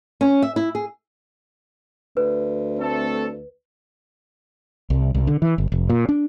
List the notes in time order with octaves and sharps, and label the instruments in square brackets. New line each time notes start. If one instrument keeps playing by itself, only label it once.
[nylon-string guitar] C#4
E5
E4
G#4
[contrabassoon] D2 [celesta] B4
[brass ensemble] A3 C4 A4
[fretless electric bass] C2
C2
D3
E3
G1
F1
A#2
D4